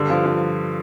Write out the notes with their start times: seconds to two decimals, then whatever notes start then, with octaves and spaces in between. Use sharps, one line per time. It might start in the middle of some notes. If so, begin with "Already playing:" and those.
Already playing: G2 D3
0.10 F3
0.26 F3